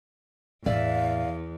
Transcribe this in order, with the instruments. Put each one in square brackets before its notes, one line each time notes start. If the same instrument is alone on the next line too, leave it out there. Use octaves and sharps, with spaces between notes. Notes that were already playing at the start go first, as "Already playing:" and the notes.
[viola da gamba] E2 [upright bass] A2 C4 [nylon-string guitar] D5 E5 [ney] F5